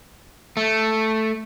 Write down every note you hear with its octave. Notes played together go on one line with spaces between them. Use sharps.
A3